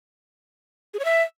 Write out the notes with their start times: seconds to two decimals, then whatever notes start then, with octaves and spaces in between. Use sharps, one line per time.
0.94 G#4
0.99 C#5
1.05 E5